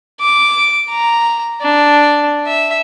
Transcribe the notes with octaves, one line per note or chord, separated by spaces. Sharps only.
D6
A#5
D4
E5